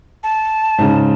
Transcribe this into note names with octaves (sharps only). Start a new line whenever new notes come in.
A5
G#2 C#3